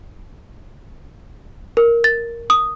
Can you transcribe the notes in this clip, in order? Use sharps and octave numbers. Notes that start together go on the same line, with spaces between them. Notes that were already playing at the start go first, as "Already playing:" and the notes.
A#4
A6
D#6